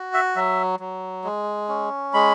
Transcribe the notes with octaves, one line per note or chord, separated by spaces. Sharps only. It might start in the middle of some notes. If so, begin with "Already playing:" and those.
Already playing: F#4
E5
F#3 E5
F#3
G#3
C#4
G#3 B5